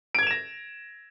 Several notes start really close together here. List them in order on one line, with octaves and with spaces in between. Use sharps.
D7 G#6 F7 E7 A#6